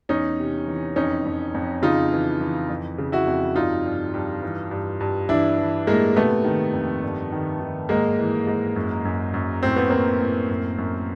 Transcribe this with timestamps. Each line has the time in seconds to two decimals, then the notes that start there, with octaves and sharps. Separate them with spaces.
0.09 E2 C#4 D#4
0.39 C3
0.67 E3
0.96 F2 C#4 D#4
1.25 F2
1.54 F2
1.82 C#3 D#4 F4
2.12 E3
2.41 E3
2.69 F2
2.98 C#3
3.12 E4 F#4
3.27 F2
3.56 G2 D#4 F4
3.85 G2
4.14 G2
4.42 E3
4.71 G2
5.01 G2
5.29 E3 D4 E4
5.58 E3
5.87 A2 G#3 A#3
6.16 C3 A3 B3
6.44 D#3
6.73 F2
7.02 G2
7.32 D#3
7.60 D#3
7.89 G#2 G#3 A#3
8.19 E3
8.47 G#2
8.76 F#2
9.05 F#2
9.34 F#2
9.63 A2 C4
9.76 B3
9.90 A2 A#3 C4
10.20 A2
10.49 F#2
10.78 F#2